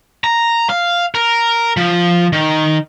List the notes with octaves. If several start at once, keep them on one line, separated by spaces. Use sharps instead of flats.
A#5
F5
A#4
F3
D#3